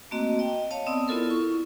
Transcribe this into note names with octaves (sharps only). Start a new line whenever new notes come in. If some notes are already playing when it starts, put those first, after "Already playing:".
A3 A#3 C4 F#4 D#5
D#5 G5
C#5 D#5 F5 A5
B3 C4 D5 D#6 E6
B3 E4 F4 A4 A#4
E4 C#6